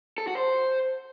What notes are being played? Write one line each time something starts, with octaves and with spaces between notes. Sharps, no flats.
A4
F#4
C5